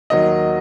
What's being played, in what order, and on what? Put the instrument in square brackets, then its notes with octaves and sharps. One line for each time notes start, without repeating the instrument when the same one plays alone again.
[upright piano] D#2 D#3 F#3 D#5